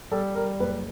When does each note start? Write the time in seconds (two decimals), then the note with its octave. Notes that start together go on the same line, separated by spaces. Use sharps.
0.11 G3 A4
0.35 G3 A#4
0.60 F#1 B4